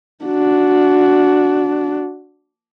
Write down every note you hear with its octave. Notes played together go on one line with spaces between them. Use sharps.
D4 F#4